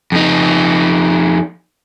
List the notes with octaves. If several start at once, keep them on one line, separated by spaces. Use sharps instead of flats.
F2 D#4